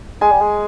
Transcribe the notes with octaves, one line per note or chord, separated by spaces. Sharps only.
G#3 G#5
G3
G#3